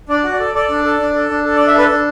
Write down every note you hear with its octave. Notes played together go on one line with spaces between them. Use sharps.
D4 D5
F#4
D5
A4
A4 D5
D4
A4
D4
A4
D4
A4
D5
D4
E5
A4 B4
D4